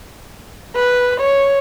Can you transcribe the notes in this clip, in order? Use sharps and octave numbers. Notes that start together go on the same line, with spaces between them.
B4
C#5